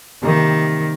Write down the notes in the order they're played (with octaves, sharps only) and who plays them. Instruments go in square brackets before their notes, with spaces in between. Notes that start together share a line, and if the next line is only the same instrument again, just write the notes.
[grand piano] C3 G3 A#3 D#4 [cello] D#3